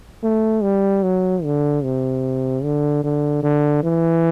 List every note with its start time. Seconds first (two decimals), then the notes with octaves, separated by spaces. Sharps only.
0.23 A3
0.63 G3
1.03 F#3
1.44 D3
1.84 C3
2.63 D3
3.04 D3
3.43 D3
3.83 E3